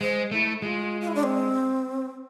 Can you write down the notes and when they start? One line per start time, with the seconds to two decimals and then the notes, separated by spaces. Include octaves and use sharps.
0.01 G#3 C5
0.31 A3 E4
0.62 G#3 F4
1.01 F4
1.08 E4
1.15 D4
1.23 C4